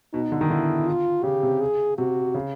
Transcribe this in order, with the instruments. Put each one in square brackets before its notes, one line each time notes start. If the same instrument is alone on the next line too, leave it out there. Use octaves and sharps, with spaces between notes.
[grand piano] B2 [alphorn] D#4
[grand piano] D3
D#3
[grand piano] D3 [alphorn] E4
[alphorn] F4
[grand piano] C#3 [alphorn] G4
[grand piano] C3
[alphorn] G#4
[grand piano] C3 [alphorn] F#4
[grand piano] C#3